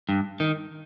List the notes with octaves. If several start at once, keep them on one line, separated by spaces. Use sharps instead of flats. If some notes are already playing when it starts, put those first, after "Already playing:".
G2
D#3